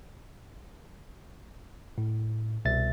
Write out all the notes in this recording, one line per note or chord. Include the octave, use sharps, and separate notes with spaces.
A2
C2 B2 E5 A6